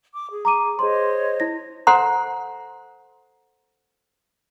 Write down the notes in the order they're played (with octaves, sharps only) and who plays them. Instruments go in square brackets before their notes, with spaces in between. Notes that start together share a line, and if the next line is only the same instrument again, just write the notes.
[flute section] D6
G#4
[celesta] A#5 D6 D#7
[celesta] G#4 C6 [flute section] C5 C#5 D#5
[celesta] E4 A#6
[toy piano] A4 C5 F#5 A#5 C6